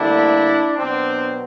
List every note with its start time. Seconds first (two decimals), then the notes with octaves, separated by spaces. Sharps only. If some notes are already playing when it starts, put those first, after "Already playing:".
Already playing: D2 D3 G3 A#3 D4 E4
0.78 B2 F#3 B3 C4 D4